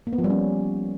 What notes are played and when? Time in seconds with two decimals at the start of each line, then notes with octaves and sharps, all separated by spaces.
0.07 A#3
0.13 B3
0.18 F3
0.24 G3
0.30 C#4